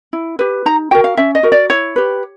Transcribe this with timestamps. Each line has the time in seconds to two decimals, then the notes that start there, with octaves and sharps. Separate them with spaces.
0.13 E4
0.39 G4 B4
0.66 D#4 A#5
0.91 F#4 A#4 G5
1.04 F5
1.17 C#4 E5
1.35 D#5
1.43 F#4 A#4
1.52 D5
1.70 E4 C#5
1.96 G4 B4